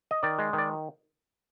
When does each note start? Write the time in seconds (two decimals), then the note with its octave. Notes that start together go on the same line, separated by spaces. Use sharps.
0.11 D#5
0.23 D#3 D5
0.39 G#3
0.53 D#3
0.58 D5